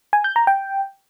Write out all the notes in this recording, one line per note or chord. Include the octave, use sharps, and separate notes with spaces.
G#5
G6
A#5
G5